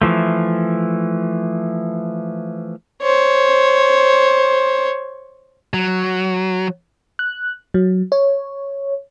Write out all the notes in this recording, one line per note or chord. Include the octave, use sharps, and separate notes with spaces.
E3 F3 A3
C5 C#5
F#3
F#6
F#3
C#5